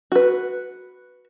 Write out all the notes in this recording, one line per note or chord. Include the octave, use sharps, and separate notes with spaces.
F#4 B4